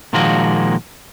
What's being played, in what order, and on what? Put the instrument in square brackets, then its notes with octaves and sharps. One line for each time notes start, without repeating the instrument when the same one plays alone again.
[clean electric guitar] A#2 D#3 F3 G#3 A#3 F#4